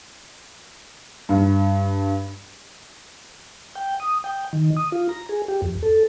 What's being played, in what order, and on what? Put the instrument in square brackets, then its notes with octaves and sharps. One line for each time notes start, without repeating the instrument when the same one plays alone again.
[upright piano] G2
[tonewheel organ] G5
D#6
G5
D#3
D#6
F4
A#5
G#4
G4
F2
A4